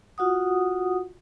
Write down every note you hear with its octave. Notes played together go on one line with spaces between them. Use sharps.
F4 F#4 F#5 D#6